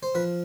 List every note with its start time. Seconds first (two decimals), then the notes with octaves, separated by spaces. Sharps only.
0.03 C5
0.15 F3 B4